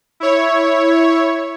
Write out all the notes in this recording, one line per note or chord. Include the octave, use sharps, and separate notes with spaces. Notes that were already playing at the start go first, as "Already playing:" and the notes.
E4 C#5